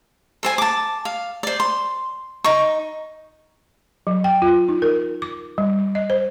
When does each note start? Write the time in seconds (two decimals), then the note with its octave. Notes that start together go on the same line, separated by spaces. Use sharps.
0.43 A4 C5 G#5
0.58 A5 D6
1.05 F5
1.43 C5 D5
1.60 C6
2.44 D#4 C#6
4.07 F#3
4.24 G5
4.42 F4
4.69 D#4
4.82 A#4
5.22 D6
5.58 G3
5.95 D#5
6.10 C5